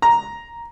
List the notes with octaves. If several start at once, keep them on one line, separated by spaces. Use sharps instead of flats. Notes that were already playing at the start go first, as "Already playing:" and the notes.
A#5